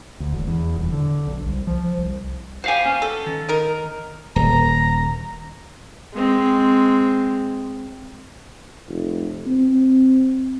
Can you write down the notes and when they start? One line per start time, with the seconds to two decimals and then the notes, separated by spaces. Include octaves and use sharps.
0.20 D2
0.32 E1
0.48 E2
0.76 D#1
0.92 D3
1.27 B1
1.46 C2
1.67 F3
1.98 C2
2.64 F#4 G4 C5 F5 G#5
2.86 B3 C#4
3.02 A4
3.26 D#3
3.49 D#4 A#4
4.36 D#1 A#5
6.13 G#3 C4
8.88 F1
9.47 C4